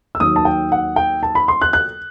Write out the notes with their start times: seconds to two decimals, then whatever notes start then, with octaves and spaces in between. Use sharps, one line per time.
0.15 E6
0.20 D#2 D#3 F#3 D#6
0.36 A5
0.45 G5
0.72 F#5
0.96 G5
1.23 A5
1.35 B5
1.48 C6
1.62 F#6
1.73 F#6